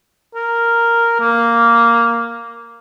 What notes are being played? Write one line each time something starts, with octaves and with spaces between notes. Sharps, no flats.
A#4
A#3